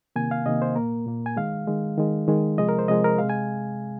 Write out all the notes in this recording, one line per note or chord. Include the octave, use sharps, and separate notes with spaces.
C3 D#3 A#3 G#5
F5
C3 D#3 A#3 D#5
C5
A#2 A#3 A#4
A#2 A#3
G#5
D#3 G#3 F5
D#3 G#3
D#3 G#3
D#3 G#3
C3 F3 G#3 D#5
A#4
C5
C3 F3 G#3 D#5
A#4
C3 G#3 F5
G#5